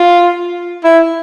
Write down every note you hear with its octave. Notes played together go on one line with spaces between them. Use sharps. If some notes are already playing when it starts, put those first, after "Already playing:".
Already playing: F4
E4